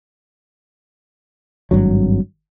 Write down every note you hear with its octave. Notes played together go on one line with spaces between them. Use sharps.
G#1 G2 F#3